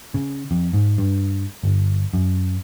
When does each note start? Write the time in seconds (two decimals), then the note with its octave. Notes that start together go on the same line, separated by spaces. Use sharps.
0.14 C#3
0.51 F2
0.73 G#2
0.98 G2
1.63 G1
2.13 F#2